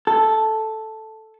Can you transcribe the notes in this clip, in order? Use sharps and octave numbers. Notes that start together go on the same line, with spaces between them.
A4